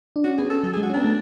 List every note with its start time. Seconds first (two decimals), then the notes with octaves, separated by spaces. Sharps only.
0.16 D4
0.24 C#4 F#4
0.37 B3 G#4
0.45 C#4
0.50 A4
0.64 F#3 A4
0.74 G#4
0.77 G#3
0.83 F#4
0.90 C#4
0.94 B3 D4
1.04 A3